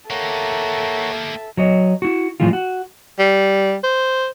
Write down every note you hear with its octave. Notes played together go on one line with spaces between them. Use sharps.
A#3 G4 A4 A#4 C#5 E5 F#5
F#3 C#5 D#5
E4 F#4
A2 E3 F3 G#3 F4
F#4
G3
C5